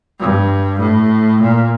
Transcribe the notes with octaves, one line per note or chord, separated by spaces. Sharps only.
G2
A2
A#2